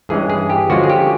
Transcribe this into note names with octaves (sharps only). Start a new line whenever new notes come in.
G2 E3 G#3 C#4 G#4
G#4
G4
D3 F3 G#3 C#4 F4 F#4
G#4
G4